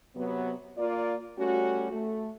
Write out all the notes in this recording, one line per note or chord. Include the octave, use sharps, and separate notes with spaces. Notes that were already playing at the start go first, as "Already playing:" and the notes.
C3 F#3 B3
A#3 F4 D5
G3 A3 C#4 F#4
A3